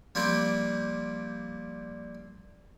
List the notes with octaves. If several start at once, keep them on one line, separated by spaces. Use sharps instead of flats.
F3 G3 A#3 C4 D4 D5